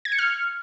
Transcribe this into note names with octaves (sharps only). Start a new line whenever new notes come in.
G#6
C#7
F6